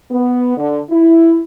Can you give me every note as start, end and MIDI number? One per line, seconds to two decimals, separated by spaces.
0.11 0.53 59
0.58 0.80 50
0.90 1.41 64